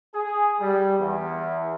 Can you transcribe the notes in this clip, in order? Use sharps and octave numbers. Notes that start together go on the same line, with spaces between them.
G#4
G3
E2